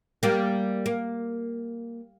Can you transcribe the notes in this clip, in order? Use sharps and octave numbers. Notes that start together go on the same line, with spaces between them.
G3 A#3
A#3